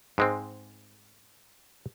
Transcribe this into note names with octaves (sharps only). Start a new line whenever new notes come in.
G#2 G#3 C4